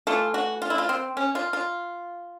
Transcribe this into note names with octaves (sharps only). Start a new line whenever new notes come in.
E3 A3 F4
F#4
F4
E4
F4
C4
C#4
F4
F4